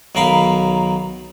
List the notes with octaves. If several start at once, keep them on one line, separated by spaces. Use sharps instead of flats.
B1 D#3 F#3 A#4 F5 B5